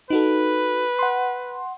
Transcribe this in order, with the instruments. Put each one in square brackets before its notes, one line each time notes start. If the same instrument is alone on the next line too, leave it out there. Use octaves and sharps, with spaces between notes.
[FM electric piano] D#4 F#4 A4 [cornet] B4
[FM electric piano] F#5 C6